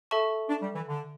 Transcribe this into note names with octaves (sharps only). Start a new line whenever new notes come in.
A4 E5 A5 C#6
D4
G3
E3
D3